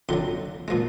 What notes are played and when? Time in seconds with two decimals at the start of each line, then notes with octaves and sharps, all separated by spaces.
0.09 F2 D3 F#3 C6
0.68 A#2 F3 G#3